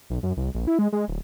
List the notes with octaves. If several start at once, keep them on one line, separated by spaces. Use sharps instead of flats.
B1
F#2
C2
A#1
E4
G#3
G#3
D1